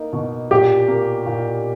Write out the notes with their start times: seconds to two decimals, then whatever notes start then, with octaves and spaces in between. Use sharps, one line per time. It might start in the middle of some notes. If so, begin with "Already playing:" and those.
Already playing: A#3 D#4
0.13 B2
0.51 A#2 G4
0.88 A#3
1.26 A#2